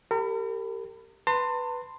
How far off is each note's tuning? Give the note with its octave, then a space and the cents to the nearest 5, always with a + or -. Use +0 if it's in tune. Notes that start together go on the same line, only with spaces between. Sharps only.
G4 +0 A#4 -40 B5 +15
B4 +0 A5 +45 C6 +0